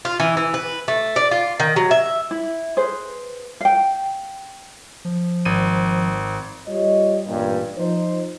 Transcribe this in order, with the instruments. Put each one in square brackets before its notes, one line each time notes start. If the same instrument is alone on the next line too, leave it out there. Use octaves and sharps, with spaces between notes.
[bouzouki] F4
E3
E3
B4
A3
D5
F4
D#3
F#3
E5
[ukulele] E4
G#4 B4 C5
F5 G5
[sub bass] F3
[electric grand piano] G#1 D#7
[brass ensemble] G3 F4 C#5 D#5
A1 G2 A#2
F3 D#4 C5